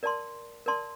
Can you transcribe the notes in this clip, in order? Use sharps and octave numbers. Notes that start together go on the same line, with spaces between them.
A#4 D5 A5 C6
A#4 D5 A5 C6